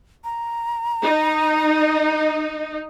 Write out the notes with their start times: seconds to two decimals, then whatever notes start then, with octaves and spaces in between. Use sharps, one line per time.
0.24 A#5
1.03 D#4